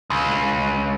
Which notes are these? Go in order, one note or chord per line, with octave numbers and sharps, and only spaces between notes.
C#2